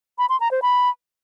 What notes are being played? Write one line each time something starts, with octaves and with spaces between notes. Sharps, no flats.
B5
C6
A#5
C5
B5